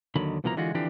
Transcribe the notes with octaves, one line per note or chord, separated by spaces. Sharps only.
D#2 D3 D#3 F#3 B5
C2 B2 E3 F3 A#3 A#5
D3 E3 G#3 F4 F#4
D3 E3 F3 C4 D4 G4